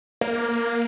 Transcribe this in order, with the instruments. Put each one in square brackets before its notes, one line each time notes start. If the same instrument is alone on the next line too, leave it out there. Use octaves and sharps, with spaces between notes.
[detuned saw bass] A#3